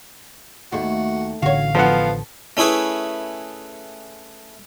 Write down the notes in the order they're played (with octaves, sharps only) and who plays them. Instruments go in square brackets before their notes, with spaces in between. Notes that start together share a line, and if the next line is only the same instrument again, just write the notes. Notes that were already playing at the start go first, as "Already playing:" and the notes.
[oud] D#2 A3 [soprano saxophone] F#4
[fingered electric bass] A1 D3 [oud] F#4 C#5 [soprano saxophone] F5
[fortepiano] F3 B3 F#5 [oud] A4
[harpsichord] A3 C#4 E4 G#4 B4